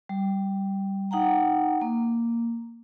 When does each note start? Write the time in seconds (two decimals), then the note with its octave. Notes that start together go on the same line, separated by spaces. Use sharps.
0.09 G3
1.11 D#4 F#5 G5 A#5
1.81 A#3